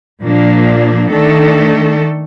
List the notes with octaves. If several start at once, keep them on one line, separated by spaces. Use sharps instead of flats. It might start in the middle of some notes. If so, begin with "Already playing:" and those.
A#2 F3 A#3 D4
D#3 A3 D4 A4